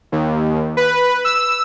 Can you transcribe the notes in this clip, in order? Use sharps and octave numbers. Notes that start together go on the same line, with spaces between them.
D#2
B4
E6